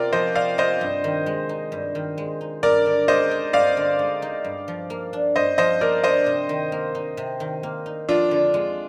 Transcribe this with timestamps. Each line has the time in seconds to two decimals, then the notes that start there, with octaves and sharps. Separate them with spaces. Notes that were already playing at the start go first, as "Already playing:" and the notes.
Already playing: C3 C4 F4 A#4 D5
0.13 F3 C5 D#5
0.35 C4 D5 F5
0.58 C3 C5 D#5
0.81 G2
1.04 D#3
1.26 G#3
1.49 D#4
1.72 G2
1.95 D#3
2.18 G#3
2.41 D#4
2.63 G2 A#4 D5
2.86 D3
3.08 G#3 C5 D#5
3.31 D#4
3.53 G2 D5 F5
3.77 D3
3.99 G#3
4.22 D#4
4.44 G2
4.68 F3
4.90 A#3
5.13 D4
5.36 G2 C5 D#5
5.58 F3 C5 D#5
5.81 A#3 A#4 D5
6.04 D4 C5 D#5
6.26 C3
6.49 D#3
6.72 A#3
6.95 D#4
7.17 C3
7.40 D#3
7.63 A#3
7.86 D#4
8.09 F2 D4 F4
8.31 D3
8.54 G#3